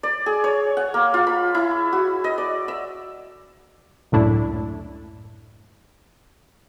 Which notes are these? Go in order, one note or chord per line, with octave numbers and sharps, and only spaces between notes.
D5
G#4
C#5
F#5
A#3
F4
B5
E4
F#4
D#5
D5
E5
C#2 F#2 A2 D4 E4